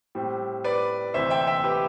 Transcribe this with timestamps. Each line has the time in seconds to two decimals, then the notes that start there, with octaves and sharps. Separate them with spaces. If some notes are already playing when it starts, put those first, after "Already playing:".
0.15 A2 G3 C4
0.64 B4 D5
1.14 D2 C3 E3 C5 E5
1.30 E5 G5
1.47 E5 G5
1.64 G4 B4